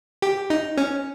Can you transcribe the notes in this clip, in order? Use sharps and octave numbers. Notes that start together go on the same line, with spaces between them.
G4
D#4
C#4